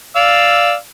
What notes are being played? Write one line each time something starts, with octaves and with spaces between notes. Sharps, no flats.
D5 F5 E6